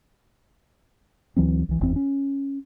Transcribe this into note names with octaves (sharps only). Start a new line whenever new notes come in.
D2 E3 F#3 C4
C2 E3
F#1 E2 E3 C4
C#4